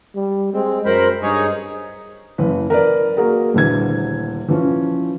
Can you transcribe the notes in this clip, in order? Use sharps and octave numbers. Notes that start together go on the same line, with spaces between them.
G3
G#3 C4
F#2 A#4 C5 B5
G2 D#4 G#4 C#5
F#1 E3 B4
A#4 B4 D5
A#3 F#4 G#4 A#4
D#1 D2 E3 G#6
E3 F3 C#4